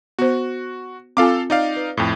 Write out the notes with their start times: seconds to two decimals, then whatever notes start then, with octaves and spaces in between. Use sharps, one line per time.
0.19 B3 F#4 C5
1.17 C4 F4 A4 F5 G#5 D6
1.50 D#4 D5 F5
1.76 B4
1.97 F2 A2